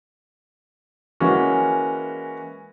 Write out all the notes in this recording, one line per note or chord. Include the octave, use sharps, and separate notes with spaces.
E3 G#3 A#3 C#4 F#4